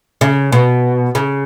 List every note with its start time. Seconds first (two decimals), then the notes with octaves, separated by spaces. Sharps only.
0.21 C#3
0.52 B2
1.15 C#3